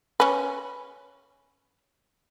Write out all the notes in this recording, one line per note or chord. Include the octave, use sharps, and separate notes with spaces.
C#4 B4